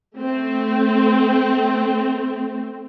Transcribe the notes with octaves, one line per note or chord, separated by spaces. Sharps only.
A3 C4